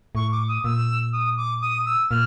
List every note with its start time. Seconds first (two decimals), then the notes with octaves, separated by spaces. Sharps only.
0.15 A2 C#6
0.32 D6
0.48 D#6
0.64 A#2 E6
1.13 D#6
1.37 D6
1.61 D#6
1.86 E6
2.10 A#2 F6